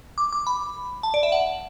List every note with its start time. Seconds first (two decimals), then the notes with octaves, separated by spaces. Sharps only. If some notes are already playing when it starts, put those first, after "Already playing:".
0.18 D6
0.32 D6
0.47 B5
1.03 A5
1.14 D5
1.23 E5
1.32 F#5